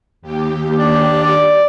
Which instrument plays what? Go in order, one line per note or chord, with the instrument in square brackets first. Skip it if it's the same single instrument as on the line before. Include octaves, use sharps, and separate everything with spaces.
[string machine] D#2 G4
[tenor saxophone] D4
[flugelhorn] D5